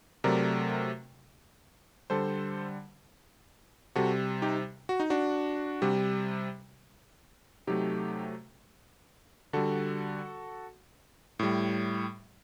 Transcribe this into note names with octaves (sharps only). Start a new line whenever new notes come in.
C3 F#3 A3 A#4 D5
D3 G3 A4 C5
C3 G3 F#4 A4
D#4 G4
F#4
D#4
D4 F#4
C3 G3
C3 F#3 A3 D#4 G4
D3 G3 F#4 A4
A2 G3